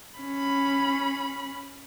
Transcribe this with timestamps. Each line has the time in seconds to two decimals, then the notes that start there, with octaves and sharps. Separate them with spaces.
0.20 C#4 B5